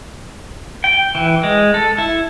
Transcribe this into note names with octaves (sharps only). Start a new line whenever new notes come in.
G5
E3
G#3
A4
E4